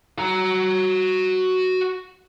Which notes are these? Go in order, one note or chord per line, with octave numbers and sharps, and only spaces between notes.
F#4 A#5